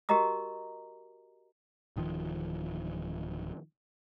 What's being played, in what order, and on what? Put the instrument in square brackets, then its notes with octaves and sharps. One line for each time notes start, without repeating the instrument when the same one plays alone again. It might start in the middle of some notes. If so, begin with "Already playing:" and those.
[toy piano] F#4 G4 A#4 D#5 A#5 D#6
[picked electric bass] D1 D#3 F3